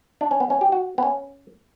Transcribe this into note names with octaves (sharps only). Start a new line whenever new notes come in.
D4
C#4
B3
C#4
G4
F#4
B3
C#4